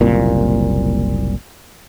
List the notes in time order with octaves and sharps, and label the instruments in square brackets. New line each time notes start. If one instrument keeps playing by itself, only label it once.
[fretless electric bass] F#1 C2 A#2